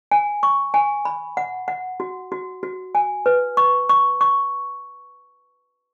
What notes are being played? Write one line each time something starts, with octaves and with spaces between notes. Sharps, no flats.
G#5
C#6
G#5
B5
F#5
F#5
F#4
F#4
F#4
G#5
B4
C#6
C#6
C#6